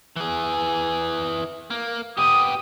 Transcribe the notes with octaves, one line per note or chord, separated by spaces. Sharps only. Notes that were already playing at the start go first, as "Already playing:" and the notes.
E3 G#4
A#3
B3 G4 D#6